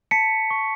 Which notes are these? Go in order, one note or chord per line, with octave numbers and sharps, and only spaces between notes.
A5 B6 C#7
C#6